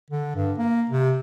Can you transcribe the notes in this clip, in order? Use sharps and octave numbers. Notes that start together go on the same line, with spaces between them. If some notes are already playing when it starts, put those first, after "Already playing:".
D3
G2
A#3
C3